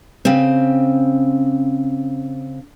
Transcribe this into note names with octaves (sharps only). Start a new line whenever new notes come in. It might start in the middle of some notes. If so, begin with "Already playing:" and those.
C#3 C4